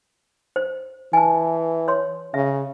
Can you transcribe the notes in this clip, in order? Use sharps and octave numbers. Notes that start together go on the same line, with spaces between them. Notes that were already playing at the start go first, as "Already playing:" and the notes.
C5
E3 G#5 A5
C#5 C6
C#3 E5